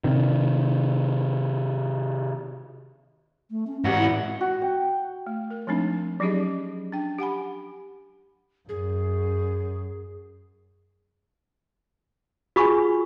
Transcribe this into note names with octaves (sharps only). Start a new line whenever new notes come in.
C3 D#3
A3
C#4
G#2 F#4 G4
E4
F#4
G5
A3
A#4
F3 G#3 A3 C4 D4 D#4
F#3 C#4 D#4 G4 G#4 D#5
D4 G5
G4 F#5 G#5 B5
F#2 G#4
F4 F#4 G#4 G#5 B5 C#6